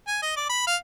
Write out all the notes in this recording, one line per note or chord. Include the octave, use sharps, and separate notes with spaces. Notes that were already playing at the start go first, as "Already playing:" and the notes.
G#5
D#5
D5
B5
F5